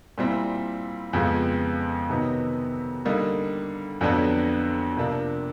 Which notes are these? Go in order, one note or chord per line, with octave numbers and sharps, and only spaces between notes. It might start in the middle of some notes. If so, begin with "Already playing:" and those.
A#2 G3 C4 E4
F2 C#3 F3 G#3 B3
C3 D#3 F#3 B3 D#4
D3 G3 A#3 D#4
F2 D3 F#3 B3 D4
C3 F3 A#3 D4